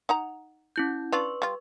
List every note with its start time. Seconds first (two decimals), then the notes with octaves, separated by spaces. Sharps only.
0.09 D#4 F#5 A#5
0.76 C#4 E4 G6
1.12 D4 F4 B4 C#6
1.42 G3 F4